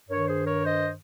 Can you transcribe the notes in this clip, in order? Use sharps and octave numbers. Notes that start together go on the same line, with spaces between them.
G2 D#3 A#4 C#5
G#4 C5
A#4 C#5
C5 D#5